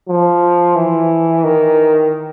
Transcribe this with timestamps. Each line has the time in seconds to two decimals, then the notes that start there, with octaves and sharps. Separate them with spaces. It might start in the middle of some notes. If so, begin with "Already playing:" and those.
0.08 F3
0.76 E3
1.44 D#3